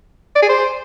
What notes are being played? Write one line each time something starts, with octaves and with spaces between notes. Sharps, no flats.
D5
G#4
C5